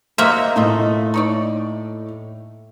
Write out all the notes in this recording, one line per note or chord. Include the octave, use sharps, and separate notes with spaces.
A#3 F#4 C5 D#5 E5
A2 A3 F4 D#5
D#4 C#5 D5